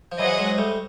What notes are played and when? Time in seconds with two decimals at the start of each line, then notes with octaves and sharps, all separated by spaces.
0.12 F3
0.19 E3 F#3 G#4 C5 D#5 F#5
0.39 F#3 G#3
0.58 G3 A3